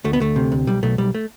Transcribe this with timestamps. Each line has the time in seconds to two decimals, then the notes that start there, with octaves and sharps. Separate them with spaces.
0.04 D2 A3
0.13 B3
0.20 D2 A3
0.36 C3
0.52 D2
0.67 B1 G3
0.83 B1 A3
0.98 B1 G3
1.15 A3